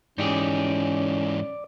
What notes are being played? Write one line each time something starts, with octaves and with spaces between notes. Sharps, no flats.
G#2 E3 C#4 D#4 G4 G#4 D5